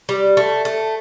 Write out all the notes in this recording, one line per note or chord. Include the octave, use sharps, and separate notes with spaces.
G3
A3
A3